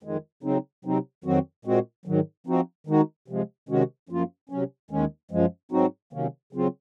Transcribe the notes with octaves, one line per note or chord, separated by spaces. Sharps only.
F2 D#3 G#3
C#3 F#3 C4 D#4
C3 F#3 C4 D#4
F2 D#3 F#3 C4 F#4
A#2 G#3 C4 F#4
G#2 D#3 F#3
F3 C4 D#4 F#4
D#3 G#3 D#4 F#4
C3 F3 G#3
C3 D#3 G#3 C#4 F#4
F#2 F3 A#3 F4
C3 F#3 C#4
D#2 D#3 G#3 C#4
F#2 F3 G#3
G#2 F#3 C4 D#4 F#4
C3 D#3 F#3 A#3 C#4
C#3 F#3 C4 F4